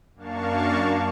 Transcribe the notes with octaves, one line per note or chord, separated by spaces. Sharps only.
F#2 A#3 D4 F5 A5 C#6